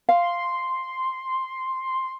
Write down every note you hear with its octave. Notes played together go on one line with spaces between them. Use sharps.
F5 C6